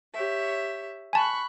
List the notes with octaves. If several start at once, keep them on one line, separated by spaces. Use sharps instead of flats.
G4 C#5 E5
G#5 A5 B5 C#6 F#6